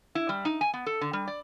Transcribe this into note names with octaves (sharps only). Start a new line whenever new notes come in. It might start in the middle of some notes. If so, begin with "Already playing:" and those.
E4
G3
D#4
G#5
B3
A4
D3
G3
D5